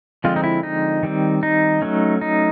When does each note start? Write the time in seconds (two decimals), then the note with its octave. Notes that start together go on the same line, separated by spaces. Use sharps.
0.24 D3 F3 G#3 C4 F4
0.36 D#4
0.44 E4
0.63 D#4
1.03 D#3 G3 C4
1.43 D#4
1.82 F#3 A3 C#4
2.21 D#4